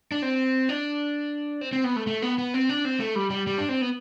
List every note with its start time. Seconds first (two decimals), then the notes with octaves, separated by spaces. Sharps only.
0.12 D4
0.22 C4
0.69 D4
1.61 C4
1.73 C4
1.84 B3
1.96 A3
2.07 A3
2.22 B3
2.38 B3
2.54 C4
2.69 D4
2.85 C4
3.00 A3
3.16 G3
3.30 G3
3.47 G3
3.58 D4
3.69 C4
3.82 B3